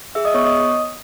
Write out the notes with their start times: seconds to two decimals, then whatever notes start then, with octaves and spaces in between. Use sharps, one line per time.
0.15 G#4 E5 E6
0.25 D#5 D#6
0.34 B3 C#5 C#6
0.44 D#5 D#6